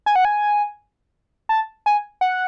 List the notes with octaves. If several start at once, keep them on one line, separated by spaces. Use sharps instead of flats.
G#5
F#5
G#5
A5
G#5
F#5